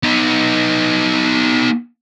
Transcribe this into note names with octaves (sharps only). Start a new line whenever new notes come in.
B3 D#4